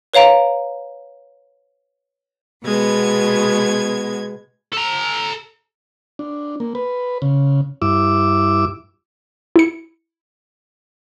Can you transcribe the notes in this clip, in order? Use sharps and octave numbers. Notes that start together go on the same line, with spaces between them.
B4 C#5 F5 A#5 D7
B2 G#3 B3 G#6
A4 A#5
D4
A#3
B4
C#3
G2 E4 D6 E6
E4 C#7